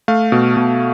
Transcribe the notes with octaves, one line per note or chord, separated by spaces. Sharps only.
A3 F5
B2
B2